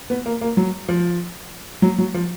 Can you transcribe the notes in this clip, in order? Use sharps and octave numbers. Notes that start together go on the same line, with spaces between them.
B3
A#3
A#3
F#3
F3
F#3
F#3
F3